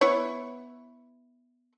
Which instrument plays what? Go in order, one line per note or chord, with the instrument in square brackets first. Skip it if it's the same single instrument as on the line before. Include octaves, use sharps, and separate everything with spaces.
[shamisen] B3 E4 C#5